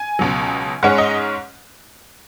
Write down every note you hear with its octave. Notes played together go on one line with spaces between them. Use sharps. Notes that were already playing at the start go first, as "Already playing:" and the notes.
Already playing: G#5
C#2 B2 F#3
G#2 G#3 C#4 F#5
D#5